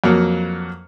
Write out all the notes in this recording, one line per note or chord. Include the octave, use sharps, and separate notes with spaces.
F2 F#3 A#3